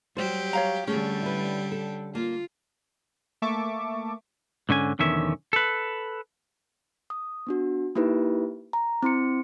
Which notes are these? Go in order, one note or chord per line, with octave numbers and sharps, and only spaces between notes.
F#3 G3 G4 C5
C#5 F5 A#5
D3 G3 A3 C#4 G4 G#4
E4 B4
A4
A#3 F4
A3 A#3 E5 A5 C#6 D6
G#2 D3 C#4 G#5
B1 E2 D3 D#3 C#4 E5
A4 B4
D#6
B3 D4 F#4
A#3 D#4 E4 G4 B4
A#5
C4 E4 C6 C#7